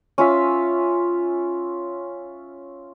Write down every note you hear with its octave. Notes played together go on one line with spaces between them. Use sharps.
C#4 F4 E5